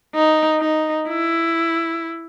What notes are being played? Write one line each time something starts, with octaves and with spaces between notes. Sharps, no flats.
D#4
D#4
E4